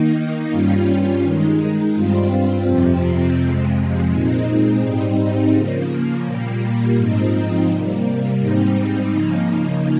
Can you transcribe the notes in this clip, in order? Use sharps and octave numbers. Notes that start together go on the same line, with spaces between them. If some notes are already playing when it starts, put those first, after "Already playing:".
Already playing: D#3 A#3 D#4
G2 G3 C#4 F4
D#3 G#3 D#4
G2 G3 C4 F4
F2 C3 F3 C4
F2 C3 F3 G#3
A#2 G#3 C4 D#4
G#2 G3 C4 D#4
C#3 F3 A#3
A#2 G3 A#3
G#2 F3 C4 D#4
C3 G3 A#3
G#2 G3 C4 D#4
C#3 F3 A#3 D#4